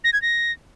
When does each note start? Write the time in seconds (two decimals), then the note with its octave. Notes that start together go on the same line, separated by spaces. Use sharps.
0.04 A#6
0.13 G#6
0.22 A#6